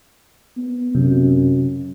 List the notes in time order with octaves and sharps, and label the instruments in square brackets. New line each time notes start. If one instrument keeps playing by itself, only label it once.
[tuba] B3
[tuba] F#2 [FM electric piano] C3